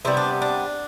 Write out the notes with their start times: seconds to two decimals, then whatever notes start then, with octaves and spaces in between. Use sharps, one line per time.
0.05 C3 G3 B3 E4
0.17 D4
0.42 D4